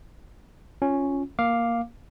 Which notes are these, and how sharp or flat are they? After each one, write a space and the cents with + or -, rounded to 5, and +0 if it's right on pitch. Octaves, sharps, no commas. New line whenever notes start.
C#4 +0 F4 +0
A#3 +0 F5 +0 D6 +0